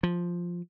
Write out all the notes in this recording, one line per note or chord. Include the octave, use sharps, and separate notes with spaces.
F3